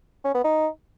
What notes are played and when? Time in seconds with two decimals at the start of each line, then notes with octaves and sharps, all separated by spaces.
0.25 C#4
0.34 B3
0.44 D#4